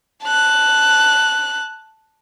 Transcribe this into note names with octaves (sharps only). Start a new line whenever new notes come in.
A5 F#6